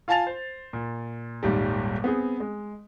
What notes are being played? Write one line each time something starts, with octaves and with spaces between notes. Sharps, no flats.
F4 F5 G#5 A5 A6 F7
C5
A#2
D#1 G#1 G3
B3 C4 G#4
G#3